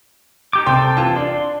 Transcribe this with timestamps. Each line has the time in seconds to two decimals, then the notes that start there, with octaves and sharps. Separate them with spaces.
0.53 D#4 G4 D6
0.66 C3 A4 G5 C6
0.97 E3 F4 A5
1.16 D4 C6